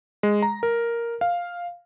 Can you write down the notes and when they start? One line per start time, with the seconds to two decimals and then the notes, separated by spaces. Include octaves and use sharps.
0.23 G#3
0.42 A#5
0.63 A#4
1.21 F5